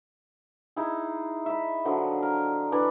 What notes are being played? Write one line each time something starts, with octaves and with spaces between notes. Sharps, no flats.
D#4 E4 G#4
E5 B5
D3 F3 F#3
A#4
E3 D4 E4 B4